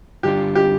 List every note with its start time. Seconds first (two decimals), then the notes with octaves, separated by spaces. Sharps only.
0.23 G2 D3 G3 D4 F4 G4
0.55 G4